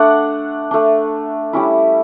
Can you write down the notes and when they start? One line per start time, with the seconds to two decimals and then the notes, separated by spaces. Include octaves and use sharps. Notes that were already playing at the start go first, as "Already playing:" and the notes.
Already playing: A3 D4 F#5
0.71 A3 D4
1.53 G3 C#4 E4